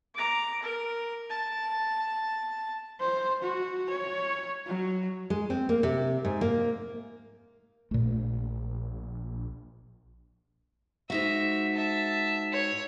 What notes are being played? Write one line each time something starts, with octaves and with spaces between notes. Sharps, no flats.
A#5 D6
A#4
A5
C5
F#4
C#5
F#3
G#3
C4
A#3
C3
G#2
A#3
A#1 A#2 A3
G#2 D#4 F#4 E5
E5 A5
C#5